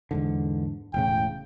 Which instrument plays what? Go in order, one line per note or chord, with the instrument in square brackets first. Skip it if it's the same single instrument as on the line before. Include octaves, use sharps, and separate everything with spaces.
[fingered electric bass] E2 G#2 D3
[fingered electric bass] E1 A2 C#3 [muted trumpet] G5